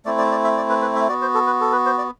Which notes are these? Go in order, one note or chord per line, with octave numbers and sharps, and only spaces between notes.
A3 C4 E4 D5
D5
D5
E5
D5
B4
B4
E5
B3 F#4 D5
C5
A4
B4
A4
B4
C5
D5